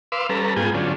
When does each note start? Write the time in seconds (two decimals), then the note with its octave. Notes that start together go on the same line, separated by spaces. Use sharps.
0.12 B4 F5 C6 D6 E6
0.29 G3 C#4 A4 B4 A#5
0.56 G#2 B3 F4 G#4 G5 G#5
0.74 D3 F#3 C#4 D4 F4